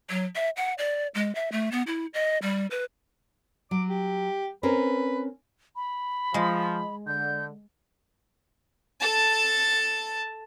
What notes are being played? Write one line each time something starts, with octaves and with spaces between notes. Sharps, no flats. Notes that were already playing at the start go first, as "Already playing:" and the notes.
F#3
E5
F#5
D5
G#3
E5
A3
B3
E4
D#5
G3
B4
F#3 D6
G4
C4 C#4 A#4 B4
B5
F3 G#3
D3 G6
A4 A5